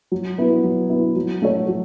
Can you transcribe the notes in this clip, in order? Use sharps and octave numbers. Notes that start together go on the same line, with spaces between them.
F#3
B3 E4
F#3
B3 E4
F#3
A3 F#4 A4 C#5
F#3